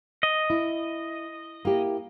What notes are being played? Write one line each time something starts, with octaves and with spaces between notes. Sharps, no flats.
D#5
E4
A#3 E4 G4